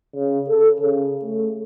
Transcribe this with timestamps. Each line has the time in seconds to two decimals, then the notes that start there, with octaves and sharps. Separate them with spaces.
0.15 C#3
0.50 A4
0.80 C#3
1.24 A3